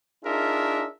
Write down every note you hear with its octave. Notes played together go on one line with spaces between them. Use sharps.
D4 D#4 F4 G#4 A#4 E5